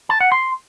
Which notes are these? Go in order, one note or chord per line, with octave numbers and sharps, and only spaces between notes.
A5
F#5
C6